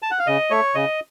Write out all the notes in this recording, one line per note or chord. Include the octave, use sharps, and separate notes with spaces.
A5
F#5
F5
C#3 D#5
A3 C#5
C#3 D#5